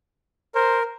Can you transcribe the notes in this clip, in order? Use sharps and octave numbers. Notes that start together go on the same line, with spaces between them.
A#4 C5